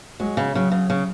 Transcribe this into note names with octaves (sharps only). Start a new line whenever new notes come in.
F#3 G#3
C#3
C#3 F#3
C#3
C#3